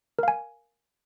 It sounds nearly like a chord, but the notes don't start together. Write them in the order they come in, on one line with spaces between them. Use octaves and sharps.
A#4 F5 G#5